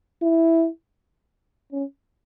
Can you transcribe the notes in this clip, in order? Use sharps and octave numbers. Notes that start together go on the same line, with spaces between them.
E4
C#4